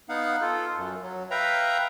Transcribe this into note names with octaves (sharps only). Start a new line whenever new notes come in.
B3 D#4 F5 F#5
F4 A4
F#2
F#3
B4 E5 F5 G5 A#5